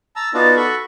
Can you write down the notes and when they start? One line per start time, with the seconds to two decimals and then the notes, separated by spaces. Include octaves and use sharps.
0.16 A5 A#5 E6
0.34 B3 D#4 F4 F#4 D5 A5
0.57 F#4 A4 B5 C#6